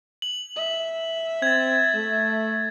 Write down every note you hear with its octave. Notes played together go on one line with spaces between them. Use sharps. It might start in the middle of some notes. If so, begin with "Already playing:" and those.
F#7
E5
C4 G#6 A6
A3